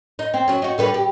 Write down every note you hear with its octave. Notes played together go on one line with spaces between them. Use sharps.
D#4
C4
F#3 C#4
D#4 F#4
D3 G3 B4
G4